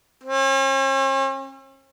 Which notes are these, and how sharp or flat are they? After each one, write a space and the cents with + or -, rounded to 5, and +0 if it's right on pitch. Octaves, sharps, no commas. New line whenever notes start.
C#4 -45